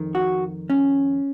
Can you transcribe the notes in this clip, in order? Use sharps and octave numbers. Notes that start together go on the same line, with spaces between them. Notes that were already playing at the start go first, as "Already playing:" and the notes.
Already playing: F2 D#3
F#4
C#4